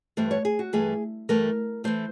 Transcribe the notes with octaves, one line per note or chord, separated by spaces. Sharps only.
G2 E3 A3 C5
C#5
G#4
F#4
G2 E3 A3 G#4
G2 E3 A3 A#4
E3 A3 C5